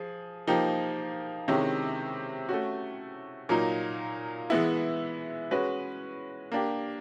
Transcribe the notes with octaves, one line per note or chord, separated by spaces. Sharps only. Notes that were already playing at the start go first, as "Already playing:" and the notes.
Already playing: F3 G#4
F3 A#3 D#4 G4
C3 D#3 G#3 C#4 E4
A3 C#4 F#4
A#2 F#3 A#3 D#4
E3 G#3 B3 E4
G#3 C#4 F#4 B4
A#3 D4 G4